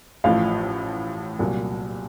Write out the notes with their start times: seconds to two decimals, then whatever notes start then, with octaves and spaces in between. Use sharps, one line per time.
0.24 A1 A2 F3 F5
1.39 C2 A#2 F#3